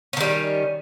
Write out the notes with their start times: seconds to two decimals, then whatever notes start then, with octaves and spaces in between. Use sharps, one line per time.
0.13 C#4
0.17 D#3
0.20 G3